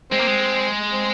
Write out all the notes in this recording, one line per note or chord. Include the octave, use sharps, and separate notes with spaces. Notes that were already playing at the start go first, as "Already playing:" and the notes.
G#3 C4
A#3
G#3
C4